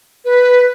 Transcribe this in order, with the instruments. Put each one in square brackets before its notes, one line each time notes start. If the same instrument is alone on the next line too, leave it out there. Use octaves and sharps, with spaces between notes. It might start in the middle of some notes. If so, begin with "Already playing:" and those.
[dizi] B4